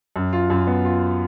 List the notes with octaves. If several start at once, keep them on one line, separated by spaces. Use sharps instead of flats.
F#2
F4
F#2
B3
F4